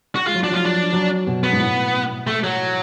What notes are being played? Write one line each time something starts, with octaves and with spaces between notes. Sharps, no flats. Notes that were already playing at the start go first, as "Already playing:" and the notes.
F#4
G#3 F4
F#3
F3 D4
F#3 F4
F3
D4
F#3
B2
B3
G#2
A2
A3
F#3